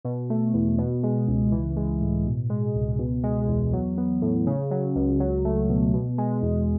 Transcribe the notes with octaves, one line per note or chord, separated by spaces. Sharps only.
B2
A3
E2
B2
G#3
C#2
E3
G#3
A2
B2
G#3
C#2
B2
G#3
E2
F#3
B3
A2
C#3
F#3
C#2
F#3
A3
B2
B2
G#3
E2